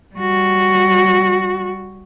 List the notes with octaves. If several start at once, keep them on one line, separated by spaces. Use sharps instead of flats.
G3 F#4